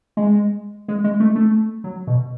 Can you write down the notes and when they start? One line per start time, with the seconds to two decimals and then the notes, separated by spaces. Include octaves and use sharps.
0.17 G#3
0.88 G#3
1.04 G#3
1.20 A3
1.35 A3
1.84 F#3
2.07 B2